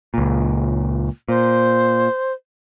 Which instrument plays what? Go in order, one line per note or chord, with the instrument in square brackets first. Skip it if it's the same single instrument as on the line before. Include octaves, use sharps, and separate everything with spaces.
[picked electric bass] C#2 A#2
[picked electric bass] A#2 [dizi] C5